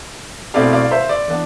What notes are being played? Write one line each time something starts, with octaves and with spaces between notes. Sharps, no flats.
B2 A3 C4 E4 D5 F5
D5 F5
C5 E5
E5
D5
E3 B3 D4